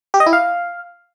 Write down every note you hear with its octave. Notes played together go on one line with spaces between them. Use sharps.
G4
D#5
E4
F5